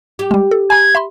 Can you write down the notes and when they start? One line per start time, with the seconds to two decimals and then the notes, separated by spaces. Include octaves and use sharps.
0.19 G4
0.31 G3 G#3
0.51 A4
0.70 G#5 A#5 G#6
0.95 E5 B5 C6